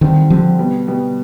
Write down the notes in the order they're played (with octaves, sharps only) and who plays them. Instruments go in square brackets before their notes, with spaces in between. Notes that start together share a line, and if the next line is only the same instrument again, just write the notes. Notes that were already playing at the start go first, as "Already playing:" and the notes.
[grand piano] D3 G3 C4 G4 [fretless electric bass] D#3
[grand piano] D3 G3 C4 G4 [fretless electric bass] F3
[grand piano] B2 G3 B3
B2 G3 B3